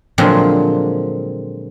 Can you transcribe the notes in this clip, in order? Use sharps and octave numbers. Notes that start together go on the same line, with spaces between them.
A#2 D3 F3 F#3 G#3 C4